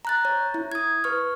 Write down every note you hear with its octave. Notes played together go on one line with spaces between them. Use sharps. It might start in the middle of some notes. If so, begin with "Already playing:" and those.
A#5 F#6 A6
C#5
E4
D#6 G#6
B4 C#6 F6